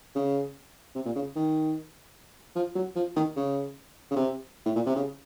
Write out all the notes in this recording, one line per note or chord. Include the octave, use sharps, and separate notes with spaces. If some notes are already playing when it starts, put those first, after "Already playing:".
C#3
C3
A#2
C#3
D#3
F3
F#3
F3
D#3
C#3
C#3
C3
A2
A#2
C3
C#3